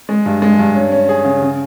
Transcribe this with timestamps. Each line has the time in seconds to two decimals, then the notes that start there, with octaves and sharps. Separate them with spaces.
0.09 G#3
0.26 G2
0.42 G#3
0.59 G2
0.75 C#4
0.92 C#4
1.09 G#4
1.25 C#3
1.42 C#3